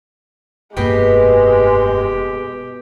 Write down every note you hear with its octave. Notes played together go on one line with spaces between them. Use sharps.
F1 G2 B2 G#3 A#3 G4 G5